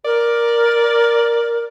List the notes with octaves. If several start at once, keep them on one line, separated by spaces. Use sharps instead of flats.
A#4 D5